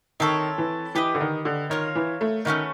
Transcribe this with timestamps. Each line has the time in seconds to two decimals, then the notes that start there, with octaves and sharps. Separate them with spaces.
0.20 D#3 C4 E4 A4 C#5
0.58 E3
0.95 E3 G4 B4 D#5
1.14 D3
1.20 D#3
1.45 D3
1.70 D#3 F4 A#4 C#5
1.95 E3
2.21 A3
2.45 D#3 A3 C#4 F#4 B4